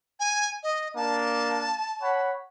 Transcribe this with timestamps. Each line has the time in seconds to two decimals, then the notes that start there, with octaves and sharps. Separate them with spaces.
0.20 G#5
0.63 D#5
0.96 A#3 D4 A5
2.02 C#5 F#5 B5